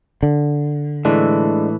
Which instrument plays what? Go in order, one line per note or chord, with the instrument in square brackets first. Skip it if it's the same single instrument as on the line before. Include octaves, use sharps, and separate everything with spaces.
[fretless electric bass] D3
[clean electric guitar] A2 E3 [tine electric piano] G#3 D4 A4